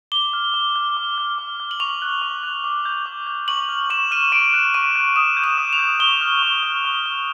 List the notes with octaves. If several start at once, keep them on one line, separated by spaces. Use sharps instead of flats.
D6 G7
F6
D6
F6
D6
F6
D6
F6
F#7
C#6 F7
F#6
C#6
F#6
D6
G6
D6
G6
C#6 F#7
F6
C#6 E7
F6 D#7
C#6 D7
F#6
C#6 D#7
F#6
D#6 E7
G6
E7
D#6
F7
G6
C#6 G7
F6
C#6
F6
C#6
F6